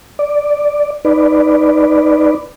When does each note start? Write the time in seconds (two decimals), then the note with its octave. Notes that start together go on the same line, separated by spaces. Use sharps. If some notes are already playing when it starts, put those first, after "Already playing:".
0.19 D5
1.05 D#4 B4 D5